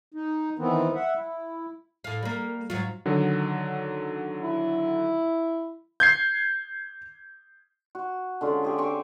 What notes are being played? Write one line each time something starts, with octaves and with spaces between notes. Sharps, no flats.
D#4
D#3 E3 B3 C4
E5 F#5
E4
A2 F5
G3 A#3
G#2 F#3 F4
D3 D#3 F#3
E4
G6 G#6 C7
F#4
D3 G#3 C#4 F4
G4 G#4 E5
C4 G4 C#6 D6